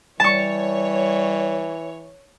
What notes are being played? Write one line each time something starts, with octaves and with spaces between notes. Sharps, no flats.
E3 G3 C#5 A5 C#6